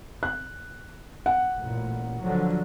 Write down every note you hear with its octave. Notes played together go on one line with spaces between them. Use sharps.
F#6
F#5
A1 A#2
D3 F3 F#3